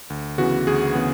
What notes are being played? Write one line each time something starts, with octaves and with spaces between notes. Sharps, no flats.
D2
C#3 E3 B3 F#4
D2 G#4
C#3 E3 B3